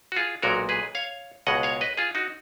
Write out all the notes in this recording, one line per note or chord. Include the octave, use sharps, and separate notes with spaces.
F#4
F4 G#4
B1 A#2 G#3 F#4 A#4
G#4 B4
C#5 F5
C#2 B2 G#3 D#5 F#5
C#5 F5
B4 D#5
F4 G#4
D#4 F#4